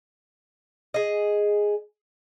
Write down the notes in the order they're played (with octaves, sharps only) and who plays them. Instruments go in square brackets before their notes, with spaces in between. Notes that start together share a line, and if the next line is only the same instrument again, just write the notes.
[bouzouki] G#4 D#5